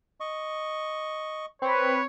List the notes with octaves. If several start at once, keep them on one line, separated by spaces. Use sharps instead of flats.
D#5 C#6
C4 B4 C#5